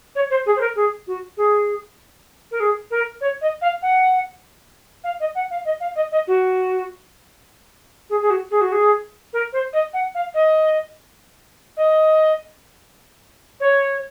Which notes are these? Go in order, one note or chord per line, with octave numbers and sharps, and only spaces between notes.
C#5
C5
G#4
C5
A#4
G#4
F#4
G#4
A#4
G#4
A#4
C#5
D#5
F5
F#5
F5
D#5
F#5
F5
D#5
F5
D#5
D#5
F#4
G#4
G#4
F#4
G#4
F#4
G#4
A#4
C5
D#5
F#5
F5
D#5
D#5
C#5